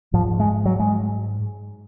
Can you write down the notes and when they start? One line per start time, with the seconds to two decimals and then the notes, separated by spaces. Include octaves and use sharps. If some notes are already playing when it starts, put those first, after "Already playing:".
0.14 G#2 F3
0.40 G#3
0.65 F#3
0.80 G#3